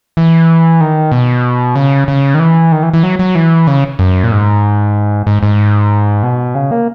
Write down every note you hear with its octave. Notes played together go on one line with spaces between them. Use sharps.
E3
D#3
B2
C#3
C#3
D#3
E3
D#3
E3
E3
F#3
F#3
E3
C#3
F#2
A#2
G#2
G#2
G#2
B2
C#3
A#3